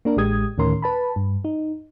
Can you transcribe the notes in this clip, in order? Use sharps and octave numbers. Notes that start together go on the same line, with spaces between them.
A#3 D4 A#4
A1 G#3 G4 D#6 G#6
D2 A2 D#3 C#4 A#4 C6
B4 A5 B5
G2
D#4